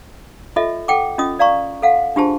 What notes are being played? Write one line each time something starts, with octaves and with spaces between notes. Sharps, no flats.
F4 A4 D#5 E5
A4 F#5 G5 D6
C#4 F4 D#5 D#6
D5 F5 A#5 C#6
A4 F5 F#5
D4 F4 G4 G#4 C5 A5